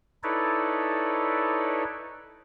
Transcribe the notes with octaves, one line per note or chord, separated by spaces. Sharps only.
D#4 E4 A4 B4 C#5 D5